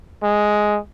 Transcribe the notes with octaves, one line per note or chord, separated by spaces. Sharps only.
G#3